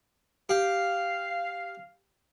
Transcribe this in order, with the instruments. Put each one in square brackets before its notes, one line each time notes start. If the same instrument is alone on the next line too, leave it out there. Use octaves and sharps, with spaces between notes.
[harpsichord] G4 [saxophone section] F5